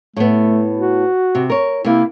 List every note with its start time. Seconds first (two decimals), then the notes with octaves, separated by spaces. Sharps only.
0.16 A2 A3 B3
0.77 F#4
1.35 C3
1.50 A#4 C#5
1.85 C3 A#3 E4